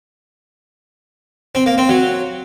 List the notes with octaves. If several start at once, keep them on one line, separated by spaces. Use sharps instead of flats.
C4
A#3
C4
F#3